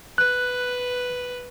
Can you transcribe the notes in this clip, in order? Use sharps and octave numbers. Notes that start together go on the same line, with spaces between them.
B4 F#6